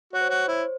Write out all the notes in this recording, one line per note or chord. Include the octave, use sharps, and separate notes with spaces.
F#4 C#5
C5
F#4 C#5
E4 C5